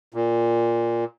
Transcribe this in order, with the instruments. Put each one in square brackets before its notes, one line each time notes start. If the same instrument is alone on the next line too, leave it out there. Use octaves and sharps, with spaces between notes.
[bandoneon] A#2